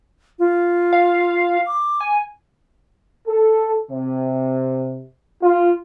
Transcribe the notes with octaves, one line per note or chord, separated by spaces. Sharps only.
F4
F5
D6
G#5
A4
C3
F4